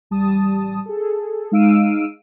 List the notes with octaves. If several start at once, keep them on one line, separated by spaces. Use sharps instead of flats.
A1 G3 A5 D#6
G#4 A4
G#3 D#4 F5 E6 D7 D#7